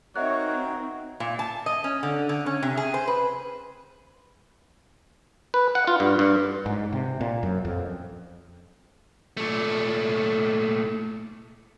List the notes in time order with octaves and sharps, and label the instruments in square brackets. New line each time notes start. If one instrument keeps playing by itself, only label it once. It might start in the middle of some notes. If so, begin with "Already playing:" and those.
[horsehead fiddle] C4 D#4 [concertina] F#4 A#4 [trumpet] C#5 [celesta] D#5 E5 F#6
[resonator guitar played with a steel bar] A#2
A5
D#5
C#4
D3
D3
C#4
C3
G#4
C5
B4
[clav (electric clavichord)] B4
F#5
F4
G2
G2
[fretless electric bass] G#2
C3
A#2
F#2
F2
[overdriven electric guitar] A#2 A3